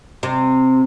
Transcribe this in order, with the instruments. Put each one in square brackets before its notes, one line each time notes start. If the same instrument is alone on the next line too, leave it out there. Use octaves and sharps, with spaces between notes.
[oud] C3